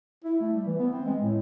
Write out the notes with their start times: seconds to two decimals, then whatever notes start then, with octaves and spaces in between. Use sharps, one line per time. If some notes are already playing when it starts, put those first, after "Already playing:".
0.24 E4
0.40 A3
0.53 G3
0.66 E3
0.79 B3
0.93 C4
1.06 G#3
1.21 A2